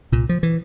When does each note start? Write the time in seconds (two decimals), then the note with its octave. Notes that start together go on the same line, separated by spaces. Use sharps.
0.12 C2 A#2
0.29 F3
0.43 E3